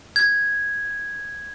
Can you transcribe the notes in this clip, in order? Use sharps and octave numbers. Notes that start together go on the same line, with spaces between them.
G#6